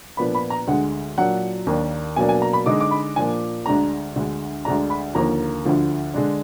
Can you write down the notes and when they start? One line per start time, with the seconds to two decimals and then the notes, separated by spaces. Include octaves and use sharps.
0.17 A#2 F3 B3 D4 B5
0.35 B5
0.50 A#5
0.67 D2 D3 G#3 F#5
1.18 A#2 F#3 D4 F#5
1.67 D#2 D#3 A#3 D4
2.16 B2 F#3 A#3 D4 G#5
2.29 G#5
2.42 A#5
2.53 B5
2.66 D3 G#3 D#4 D6
2.81 D6
2.91 B5
3.16 A#2 F3 A#3 D4 G#5
3.66 D2 D3 G#3 D4 A#5
4.16 D2 D3 G#3
4.65 D2 D3 G#3 D4 A#5
4.90 B5
5.15 D#2 D3 F3 A#3 A#5
5.65 D2 D3 F3
6.14 D3 G#3 D4